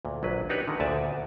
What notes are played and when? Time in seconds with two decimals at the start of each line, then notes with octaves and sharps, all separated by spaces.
0.05 D2 A#2
0.23 A#1 F#3 B4
0.49 D4 D#4 F#4 G4 B4 C#5
0.68 D3 D#3
0.80 D2 A#2 D5 G#5 A5